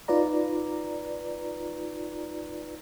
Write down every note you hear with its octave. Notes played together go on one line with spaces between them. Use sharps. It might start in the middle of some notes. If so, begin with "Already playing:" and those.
D#4 F4 B4 D5 A#5